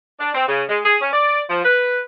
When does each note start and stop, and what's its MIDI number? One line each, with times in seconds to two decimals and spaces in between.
0.19 0.30 62
0.34 0.44 60
0.48 0.63 49
0.69 0.79 56
0.85 0.96 68
1.02 1.09 61
1.13 1.43 74
1.50 1.60 53
1.65 2.01 71